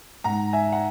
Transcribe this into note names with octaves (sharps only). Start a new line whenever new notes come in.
G#2 F#5 A#5
E5 G#5
F#5